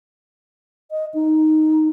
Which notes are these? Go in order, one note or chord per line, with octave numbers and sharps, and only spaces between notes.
D#5
D#4